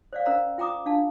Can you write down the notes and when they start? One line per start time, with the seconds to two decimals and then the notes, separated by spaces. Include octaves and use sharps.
0.13 C5 D5 F5
0.26 C#4 A#4 C5 F5 A#5
0.58 F4 G5 A#5 D6 D#6
0.86 D4 F5 A5